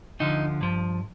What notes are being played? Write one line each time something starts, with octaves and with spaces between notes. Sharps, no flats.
D2 D3 F3 D#4
G2 F3